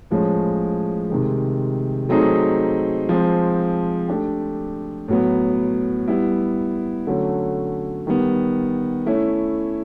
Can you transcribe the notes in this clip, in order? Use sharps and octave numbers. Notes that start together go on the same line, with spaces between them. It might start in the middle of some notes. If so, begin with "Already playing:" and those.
A2 F3 G#3 C#4
C3 D#3 G#3
F#3 A3 C4 D#4 G#4
F3 G#3 C4
A3 D4 G4
A2 F#3 B3
G3 B3 E4
D3 F#3 A3 C#4
D#3 G3 B3
A3 C#4 E4